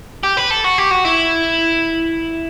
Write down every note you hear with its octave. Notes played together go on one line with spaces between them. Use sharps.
G4
B4
A4
F#4
G4
F#4
E4